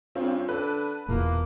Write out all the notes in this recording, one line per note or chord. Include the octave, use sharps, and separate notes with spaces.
G2 C4 C#4 F4
D3 B4 A5
E1 E2 A#2 A#3